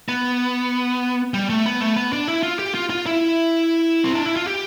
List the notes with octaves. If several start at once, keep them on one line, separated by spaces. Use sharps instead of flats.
B3
G3
A3
B3
A3
B3
D4
E4
F4
G4
F4
F4
E4
C4
D4
E4
F4
G4